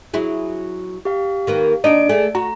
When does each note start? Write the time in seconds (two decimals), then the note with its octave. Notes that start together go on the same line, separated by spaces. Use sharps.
0.14 F#3 E4 G#4
1.05 G4 F5
1.47 D#3 A#3 B4
1.84 D#2 D4 D#4 D5 D7
2.09 A3 G#4 A4
2.35 F#4 A#5